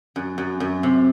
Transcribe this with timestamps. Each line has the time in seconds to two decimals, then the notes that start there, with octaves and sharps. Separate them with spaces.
0.16 F#2
0.38 F#2
0.60 F#2
0.83 C3